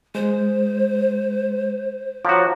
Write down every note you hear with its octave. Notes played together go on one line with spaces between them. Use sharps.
G#3 C5
F3 F#4 C#5 A#5 D6